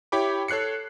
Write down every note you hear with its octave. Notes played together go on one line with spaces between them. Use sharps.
E4 G4 C#5 G5 B5 D6
A4 C#5 F#6 C7 C#7